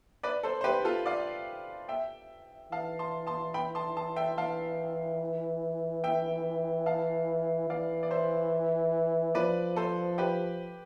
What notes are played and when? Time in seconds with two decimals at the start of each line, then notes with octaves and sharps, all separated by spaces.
0.23 B4 D5
0.43 A4 C5
0.61 C5
0.64 G4 B4
0.85 F4 A4
1.06 D5 F5
1.89 E5 G5
2.72 E3 F5 A5
2.99 A5 C6
3.27 A5 C6
3.54 G5 B5
3.75 A5 C6
3.97 A5 C6
4.16 E5 G5
4.38 E3 F5 A5
6.04 E5 G5
6.86 F5 A5
7.70 E3 D5 F5
8.03 D5
8.11 C5 E5
9.35 F3 B4 D5
9.76 A4 C5
10.18 G4 B4